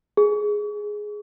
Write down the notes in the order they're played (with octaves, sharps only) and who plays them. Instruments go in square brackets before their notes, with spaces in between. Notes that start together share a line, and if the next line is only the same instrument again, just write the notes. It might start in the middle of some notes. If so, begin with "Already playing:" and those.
[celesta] G#4